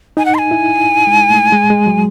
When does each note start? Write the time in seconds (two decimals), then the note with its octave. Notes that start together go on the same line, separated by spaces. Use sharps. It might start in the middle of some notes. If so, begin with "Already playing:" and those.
0.17 D#4 G#5
0.25 F#5
0.35 C6
0.38 G#5
0.51 E4
1.07 G#3
1.30 A3
1.52 G#3
1.70 G#3
1.87 F#3